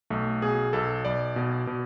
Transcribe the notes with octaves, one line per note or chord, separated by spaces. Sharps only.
B1 A3
B2 G#4
B1 A4
B1 D5
B2
B2